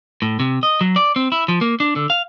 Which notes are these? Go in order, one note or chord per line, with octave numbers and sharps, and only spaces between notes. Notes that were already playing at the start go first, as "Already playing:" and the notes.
A2
C3
D#5
F#3
D5
C4
E4
F3
A#3
D4
D3
F5